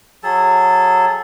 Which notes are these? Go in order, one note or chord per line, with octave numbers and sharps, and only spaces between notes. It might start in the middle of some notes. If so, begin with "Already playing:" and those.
F#3 G#4 A4 A5